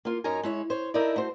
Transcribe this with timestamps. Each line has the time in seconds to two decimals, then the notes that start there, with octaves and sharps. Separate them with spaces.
0.05 A#3 F4
0.24 F#2 C#4 D#4 A#4 G#5
0.43 G#3 E4 C#5
0.70 C5 C#5
0.94 D#4 E4 A4 A#4 D5
1.16 A3 F#4 C5